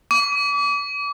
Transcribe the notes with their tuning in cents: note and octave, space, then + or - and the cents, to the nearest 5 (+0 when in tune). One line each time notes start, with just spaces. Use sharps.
D6 -35